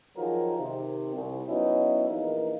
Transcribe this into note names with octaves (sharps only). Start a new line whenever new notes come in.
D#3 F3 F#3 G#4 A#4
C3 D#3
C2
F#3 B3 C#4 D#4 E4
A#1 E3 A#3 D#4 A#4